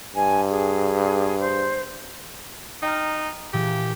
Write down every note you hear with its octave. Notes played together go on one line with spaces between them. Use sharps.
G2 G#5
G#4
C5
D#4 G5 A#5 F6
A#2 E3 G4 G#4